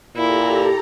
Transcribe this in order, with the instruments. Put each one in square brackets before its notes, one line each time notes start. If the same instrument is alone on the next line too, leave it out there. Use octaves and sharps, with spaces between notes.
[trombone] A#2 [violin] E4 [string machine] G4 A4 A#5